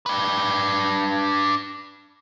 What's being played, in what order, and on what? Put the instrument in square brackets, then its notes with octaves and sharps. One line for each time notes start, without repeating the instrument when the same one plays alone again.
[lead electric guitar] D4 B4